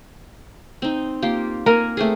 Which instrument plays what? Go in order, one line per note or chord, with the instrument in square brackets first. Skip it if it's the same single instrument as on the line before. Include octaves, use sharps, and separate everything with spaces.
[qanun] C4 D#4
A#3 F4 G4
[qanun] A#3 G#5 [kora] A#4
[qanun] A3 C4 G#4